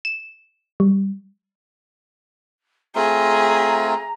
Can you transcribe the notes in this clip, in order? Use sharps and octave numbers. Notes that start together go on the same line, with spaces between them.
E7
G3
A3 C4 F4 G#4 A#5